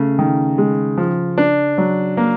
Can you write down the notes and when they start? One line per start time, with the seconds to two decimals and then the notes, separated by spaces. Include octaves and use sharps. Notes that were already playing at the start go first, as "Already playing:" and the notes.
Already playing: C#3 A3
0.19 D#3
0.58 G#3
0.98 F3
1.38 D4
1.78 F#3
2.17 A#3